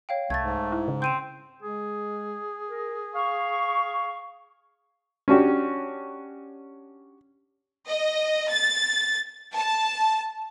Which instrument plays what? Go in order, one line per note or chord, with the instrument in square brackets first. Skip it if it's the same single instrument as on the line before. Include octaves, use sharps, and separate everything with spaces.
[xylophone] C#5 F5 G5
[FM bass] C2 [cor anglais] A3 [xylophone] G#6 A6
[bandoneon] G#2
[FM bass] E4
C#3
[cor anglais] C4 [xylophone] G6 D#7 E7
[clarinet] G#3 [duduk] G#4
[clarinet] A#4
[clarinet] F5 [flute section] C#6
[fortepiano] C#4 D4 F#4 G4
[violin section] D#5
A6
A5